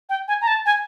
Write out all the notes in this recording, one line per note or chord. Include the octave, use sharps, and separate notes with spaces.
G5
G#5
A#5
A5
G#5